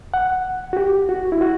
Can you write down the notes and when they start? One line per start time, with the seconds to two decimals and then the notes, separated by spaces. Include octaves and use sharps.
0.14 F#5
0.73 F#4
0.77 G4
1.09 F#4
1.32 E4
1.41 F#4